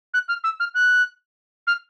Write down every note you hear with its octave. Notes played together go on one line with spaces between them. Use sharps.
F#6
F6
E6
F6
F#6
F6